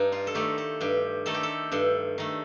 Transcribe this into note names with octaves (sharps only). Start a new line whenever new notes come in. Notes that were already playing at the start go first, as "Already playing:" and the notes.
Already playing: G2 D#4
F4
A4
D#3 A3 G4
A4
G2 G4
D#3 A3 A4
G4
A4
G2 A4
D#3 A3